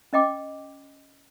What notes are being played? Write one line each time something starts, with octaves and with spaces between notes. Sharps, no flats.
C#4 D#5 G5 D6